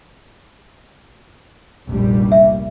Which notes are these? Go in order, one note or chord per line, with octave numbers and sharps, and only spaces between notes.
F1 A#1 G3
E5